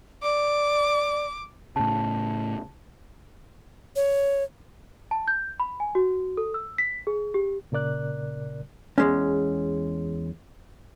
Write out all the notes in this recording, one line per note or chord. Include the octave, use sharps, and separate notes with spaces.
D5 D6
A2 C#3 A5
C#5
A5
G6
B5
G#5
F#4
A4
E6
B6
G#4
G4
A#2 C#3 A#4 D5 F#6
E2 G#3 C#4